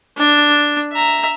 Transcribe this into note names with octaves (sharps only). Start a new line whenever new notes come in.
D4
E5 A#5